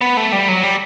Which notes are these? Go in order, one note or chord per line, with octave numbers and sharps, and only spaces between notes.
B3
A3
G3
F#3
G3